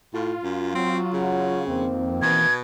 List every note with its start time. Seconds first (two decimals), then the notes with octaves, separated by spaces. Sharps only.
0.14 A2 F4
0.43 F#2
0.75 F#3 C4
1.13 C#3
1.68 F2 D#3 A#3 C4
2.22 B2 E3 G#6